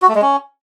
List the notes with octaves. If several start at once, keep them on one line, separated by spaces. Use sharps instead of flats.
F#4
A3
G#3
C#4